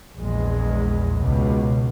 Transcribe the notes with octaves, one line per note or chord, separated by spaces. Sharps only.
A#1 E2 G#3
C#2 B2